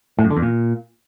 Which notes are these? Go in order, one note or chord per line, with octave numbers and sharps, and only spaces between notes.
A2
F#2
D3
E2
A#2